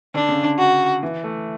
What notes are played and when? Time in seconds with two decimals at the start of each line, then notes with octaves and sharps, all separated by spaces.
0.14 D3 D4
0.29 C#3
0.43 D3
0.59 F#4
1.03 E3
1.24 A3